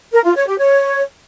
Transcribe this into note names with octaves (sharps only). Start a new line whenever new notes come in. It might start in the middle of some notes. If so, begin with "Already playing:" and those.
A#4
F4
C#5
G4
C#5